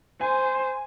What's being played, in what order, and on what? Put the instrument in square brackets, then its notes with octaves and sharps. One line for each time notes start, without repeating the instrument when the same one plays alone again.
[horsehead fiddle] C5 [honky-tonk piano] G#5